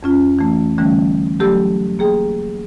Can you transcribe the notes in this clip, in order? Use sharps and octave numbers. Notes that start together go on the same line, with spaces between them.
F2 C#4 F4
E3 A3
D3 E3 G3 A3 C#4
F#3 A3 G4 A4 E6
A#3 G#4 G5